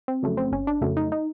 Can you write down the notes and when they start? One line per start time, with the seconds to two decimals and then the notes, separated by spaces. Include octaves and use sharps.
0.08 C4
0.23 F2 C#3 F#3 A3
0.37 C4
0.52 G1 C#4
0.67 D4
0.81 F2 C#3 F#3 A3
0.97 D#4
1.12 D#4